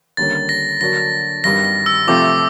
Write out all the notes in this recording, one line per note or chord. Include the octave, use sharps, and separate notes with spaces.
D#2 D3 G3 A#3 C#4 A6
A#6
D3 F#3 A#3 D4 F#4 A#6
G#1 G2 D#3 G3 A#6
A#6
E6
C3 F3 A3 C4 F4 D6